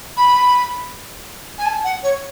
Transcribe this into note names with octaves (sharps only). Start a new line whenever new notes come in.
B5
G#5
A5
F#5
C#5